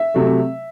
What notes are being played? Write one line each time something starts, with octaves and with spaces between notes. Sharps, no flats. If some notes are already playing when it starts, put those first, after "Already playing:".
Already playing: E5
C3 F#3 A3